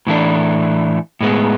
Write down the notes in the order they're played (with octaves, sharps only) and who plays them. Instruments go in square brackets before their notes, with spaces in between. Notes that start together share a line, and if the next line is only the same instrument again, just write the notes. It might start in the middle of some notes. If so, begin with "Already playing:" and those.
[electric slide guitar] A2 E3 A3 D4
A2 G#3 B3